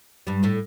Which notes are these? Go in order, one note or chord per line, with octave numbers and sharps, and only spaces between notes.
G2 G3
A2 A3